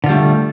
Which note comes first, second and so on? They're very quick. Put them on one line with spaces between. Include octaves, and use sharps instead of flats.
D3 F4 G3 A3